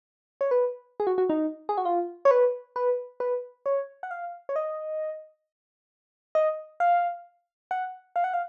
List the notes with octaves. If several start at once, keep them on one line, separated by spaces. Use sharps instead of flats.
C#5
B4
G#4
F#4
F#4
D#4
G#4
F#4
F4
C#5
B4
B4
B4
C#5
F#5
F5
C#5
D#5
D#5
F5
F#5
F5
F#5
F5